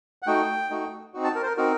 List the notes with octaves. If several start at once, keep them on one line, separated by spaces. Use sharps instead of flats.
F#5
A3 D#4 F#4 G5
A3 D#4 F#4
C4 D#4 F#4
A5
A#4
C5
A#4
C4 D#4 F#4 A#4